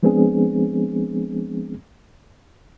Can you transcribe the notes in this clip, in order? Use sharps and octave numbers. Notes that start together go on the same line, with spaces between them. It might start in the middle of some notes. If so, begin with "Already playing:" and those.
F3 G#3 B3 C4 D4 G#4